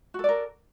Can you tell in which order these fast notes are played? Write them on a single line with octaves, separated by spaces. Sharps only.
F#4 A4 D5 A#4